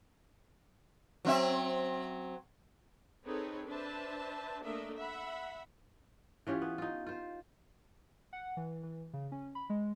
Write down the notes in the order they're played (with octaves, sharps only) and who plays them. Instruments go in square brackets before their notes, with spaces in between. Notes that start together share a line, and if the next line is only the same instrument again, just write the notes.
[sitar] F#3 C4 E5
[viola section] C4 D#4 G#4 A4 B4 C#5
D4 B4 C5 E5 A5
A3 A#3 D4 A#4 D#5 E5
E5 F#5 B5
[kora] E3 C#4 F4 G4
B3
D#4 F4
F4 C5
[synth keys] F#5
E3
E3
C#3
C#4
B5
G#3